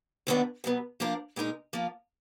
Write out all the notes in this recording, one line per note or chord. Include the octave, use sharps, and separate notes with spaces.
D#2 D#3 F#3 B3 D4
B2 F#3 B3
F3 A#3 D4 F4 A#4
A#2 G#3 D#4 A#4
F3 A#3 F4